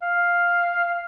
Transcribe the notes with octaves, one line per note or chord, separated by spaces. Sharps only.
F5